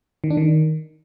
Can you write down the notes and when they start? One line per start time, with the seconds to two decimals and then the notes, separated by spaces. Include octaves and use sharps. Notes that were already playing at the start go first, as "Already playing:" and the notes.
0.24 D#3
0.30 D4
0.37 D#3